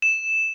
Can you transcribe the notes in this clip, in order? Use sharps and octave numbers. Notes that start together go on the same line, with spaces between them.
E7